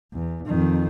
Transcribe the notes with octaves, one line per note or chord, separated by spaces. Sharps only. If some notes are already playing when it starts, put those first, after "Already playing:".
E2
F2 D#3